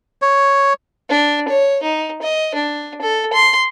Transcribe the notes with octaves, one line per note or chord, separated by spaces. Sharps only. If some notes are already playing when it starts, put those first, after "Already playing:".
C#5
D4
C#5
D#4
D#5
D4
A4
C6